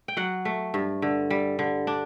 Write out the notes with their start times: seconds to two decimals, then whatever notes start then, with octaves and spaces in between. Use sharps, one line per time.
0.08 G5
0.17 F#3 F#5
0.45 A3
0.74 G2
1.02 D3
1.30 G3
1.59 D3
1.87 D4